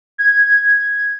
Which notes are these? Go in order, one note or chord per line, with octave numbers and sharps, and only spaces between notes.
G#6